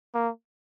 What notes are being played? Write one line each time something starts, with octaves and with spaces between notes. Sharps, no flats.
A#3